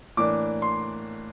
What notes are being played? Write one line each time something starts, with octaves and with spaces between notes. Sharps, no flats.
A2 E3 A#3 D4 D6
C6